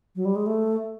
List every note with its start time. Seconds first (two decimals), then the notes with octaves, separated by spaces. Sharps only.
0.16 F#3
0.25 G3
0.36 G#3
0.46 A3